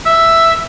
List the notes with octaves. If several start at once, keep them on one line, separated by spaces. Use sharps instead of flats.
E5